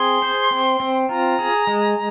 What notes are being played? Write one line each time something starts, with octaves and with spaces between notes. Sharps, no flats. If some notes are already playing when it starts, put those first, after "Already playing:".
Already playing: C4 G#4 C6
C5
C4
C4
F4 A#5
G#4
G#3